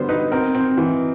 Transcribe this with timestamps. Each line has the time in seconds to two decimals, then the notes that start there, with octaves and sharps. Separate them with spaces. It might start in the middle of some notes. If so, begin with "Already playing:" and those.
Already playing: D3 G3 B3 C5
0.09 D#4 B4
0.32 C4 A#4
0.55 C4
0.77 E3